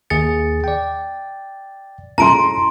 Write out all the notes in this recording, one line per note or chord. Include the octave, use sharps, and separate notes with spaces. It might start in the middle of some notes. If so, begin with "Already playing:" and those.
D#2 G#4 A6 C#7
D5 G5
C#4 E4 A4 A5 A#5 C6 D7